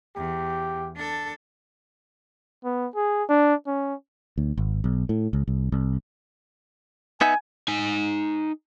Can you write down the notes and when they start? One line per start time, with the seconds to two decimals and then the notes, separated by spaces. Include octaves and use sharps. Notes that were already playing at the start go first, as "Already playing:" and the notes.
0.17 E2 G4
0.96 D4 A4
2.65 B3
2.95 G#4
3.29 D4
3.67 C#4
4.38 D2
4.57 G#1
4.84 B1
5.09 A2
5.33 C#2
5.48 C2
5.72 C2
7.21 B3 D#4 E5 G#5
7.68 D#4 G#5